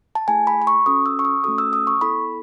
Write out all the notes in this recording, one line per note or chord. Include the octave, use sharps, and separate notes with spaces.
A5
A3 E4 G#4 G#5
B5
B5
C#6
C#4 F#4 A4 D#6
E6
C#6
D#6
A3 C#4 F#4 A4 D#6
E6
D#6
C#6
B3 E4 A4 B5